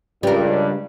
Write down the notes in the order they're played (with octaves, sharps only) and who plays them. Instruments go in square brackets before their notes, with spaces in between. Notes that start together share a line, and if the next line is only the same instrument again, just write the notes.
[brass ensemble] C#2 G2 [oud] G3 A#4